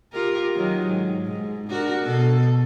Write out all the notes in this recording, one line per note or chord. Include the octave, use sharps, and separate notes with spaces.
F4 G4 A#4
D#3 F#3
G#2
G#2
D4 F#4 A#4
B2 A4